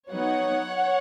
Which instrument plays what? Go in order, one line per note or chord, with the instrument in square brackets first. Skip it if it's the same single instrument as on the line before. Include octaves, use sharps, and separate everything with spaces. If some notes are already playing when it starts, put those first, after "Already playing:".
[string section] F#3 B3 D#4 C#5 F#5